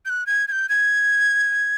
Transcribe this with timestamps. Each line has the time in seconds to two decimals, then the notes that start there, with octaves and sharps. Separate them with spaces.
0.06 G6
0.10 F#6
0.27 G#6
0.48 G#6
0.52 G6
0.69 G#6